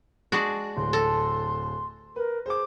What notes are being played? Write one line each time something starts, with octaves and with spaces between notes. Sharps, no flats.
G#3 D4 F#4
D1 C6
A4
A#4 B4
G#4 C5 D6